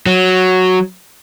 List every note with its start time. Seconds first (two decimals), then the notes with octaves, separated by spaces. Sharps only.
0.06 F#3